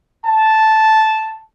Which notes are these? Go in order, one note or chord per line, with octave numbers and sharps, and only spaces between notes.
A5